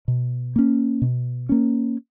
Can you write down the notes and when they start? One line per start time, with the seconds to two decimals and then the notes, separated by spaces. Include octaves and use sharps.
0.08 B2
0.56 A#3 C#4
1.02 B2
1.49 A#3 C#4